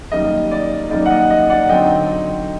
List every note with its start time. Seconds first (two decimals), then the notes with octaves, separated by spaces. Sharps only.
0.12 F#2 D#3 G3 A#3 D#4 D#5
0.51 D5
0.90 F#2 D#3 G3 A#3 D#4 D5
1.06 F#5
1.10 D#5
1.30 D#5
1.50 D5 F#5
1.69 D3 F#3 C4 D#4 D#5 G5